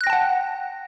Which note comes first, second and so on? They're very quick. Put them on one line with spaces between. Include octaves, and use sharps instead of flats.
F#6 A#6 G5 A5 F#5